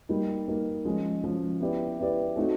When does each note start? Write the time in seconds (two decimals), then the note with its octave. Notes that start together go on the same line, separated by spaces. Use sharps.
0.09 G3 A#3 D#4
0.48 G3 A#3 D#4
0.85 F3 G#3 C#4
1.23 F3 G#3 C#4
1.60 B3 E4 G4 B4 D5
1.98 B3 E4 G4 B4 D5
2.36 A3 C4 D#4 F#4